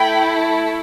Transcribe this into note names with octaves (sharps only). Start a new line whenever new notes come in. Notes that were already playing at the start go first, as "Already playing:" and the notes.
Already playing: A3 E4 A4 G5 B5